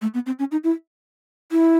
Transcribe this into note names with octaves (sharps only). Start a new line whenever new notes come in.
A3
B3
C4
C#4
D#4
E4
E4